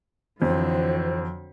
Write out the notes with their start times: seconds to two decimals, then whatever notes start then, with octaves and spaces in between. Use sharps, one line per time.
0.42 F2 D3 E3 F#3 C4 C5